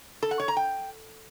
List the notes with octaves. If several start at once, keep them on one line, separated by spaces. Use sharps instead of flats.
A4
F#5
C#5
A#5
G5